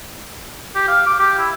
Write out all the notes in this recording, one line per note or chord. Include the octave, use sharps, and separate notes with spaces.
G4
F5
D6
G4
E4